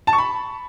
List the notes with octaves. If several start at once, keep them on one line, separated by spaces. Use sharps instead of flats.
A5
C#6
B5